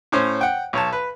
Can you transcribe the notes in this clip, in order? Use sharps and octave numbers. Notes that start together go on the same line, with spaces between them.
A2 C#4 C5
F#5 G5
B1 C#5 A5
B4